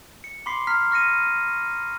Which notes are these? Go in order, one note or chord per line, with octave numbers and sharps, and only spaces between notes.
C#7
B5 C6 D6 B6 C7
A#5 F6 B6
C#6 F6 A#6 C#7 D#7